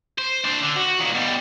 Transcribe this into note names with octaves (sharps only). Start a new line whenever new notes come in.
C5
D4 C5
D3
F#4
A#2 D#3
B2 G3